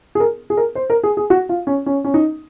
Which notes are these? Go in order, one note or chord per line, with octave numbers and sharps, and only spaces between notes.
G#4
A#4
G#4
A#4
C5
A#4
G#4
G#4
F#4
F4
C#4
C#4
C#4
D#4